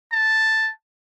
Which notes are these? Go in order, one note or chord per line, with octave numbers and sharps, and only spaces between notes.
A5